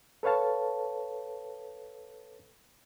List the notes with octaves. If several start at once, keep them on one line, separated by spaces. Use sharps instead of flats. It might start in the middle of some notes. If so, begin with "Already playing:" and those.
A4 B4 C#5 F5 A5